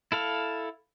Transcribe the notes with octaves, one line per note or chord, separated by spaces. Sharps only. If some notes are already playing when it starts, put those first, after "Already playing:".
E4 A4 F5